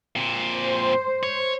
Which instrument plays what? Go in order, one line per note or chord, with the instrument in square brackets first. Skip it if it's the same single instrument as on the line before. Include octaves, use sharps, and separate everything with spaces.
[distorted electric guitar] A#2 C4
[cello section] C5
[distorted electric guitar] C#5